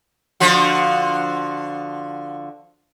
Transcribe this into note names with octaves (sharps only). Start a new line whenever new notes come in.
D3 F3 F#4